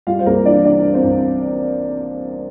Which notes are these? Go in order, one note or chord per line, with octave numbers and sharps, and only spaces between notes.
G3 F4 F5
C5
C2 A#3 A#4
E3 D4 D5
C3 D4 D5
G3
C4 C5
C2